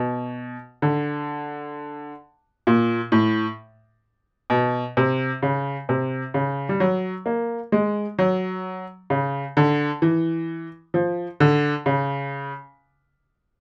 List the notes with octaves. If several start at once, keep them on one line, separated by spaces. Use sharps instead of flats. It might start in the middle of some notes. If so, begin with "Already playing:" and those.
Already playing: B2
D3
A#2
A2
B2
C3
C#3
C3
C#3
G3
F#3
A#3
G#3
F#3
C#3
D3
E3
F3
D3
C#3